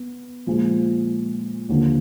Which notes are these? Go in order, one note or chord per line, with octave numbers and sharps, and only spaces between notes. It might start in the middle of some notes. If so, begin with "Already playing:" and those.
Already playing: B3
A#2 F3 G#3
D#2 D3 F3 A#3